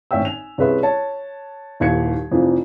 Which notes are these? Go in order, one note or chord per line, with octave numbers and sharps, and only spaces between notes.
G#1 A2 C#4 E5 G5 E6
G#5 F7
C2 C#4 G#4 B4 E5 C6
C#5 A5
D#1 D#2 E4 G#6 C#7
F1 F2 E3 F3